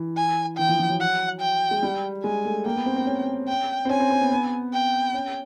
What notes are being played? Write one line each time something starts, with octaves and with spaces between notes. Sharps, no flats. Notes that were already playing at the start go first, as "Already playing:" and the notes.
Already playing: E3
G#5
E3 G5
F3
F3
F#3
F#5
G5
G#3
G3
G#3 G#5
A3
A#3 G5
B3
C4
C4
C#4
G5
C4
C#4 G#5
C4
C4
B3
B3
G5
C#4